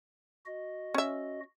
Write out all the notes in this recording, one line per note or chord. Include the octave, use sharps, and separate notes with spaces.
F#4 D#5
C#4 E5